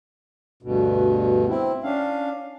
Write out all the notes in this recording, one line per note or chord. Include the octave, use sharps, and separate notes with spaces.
D2 G2 B2
C4 E4
C#4 D4 F5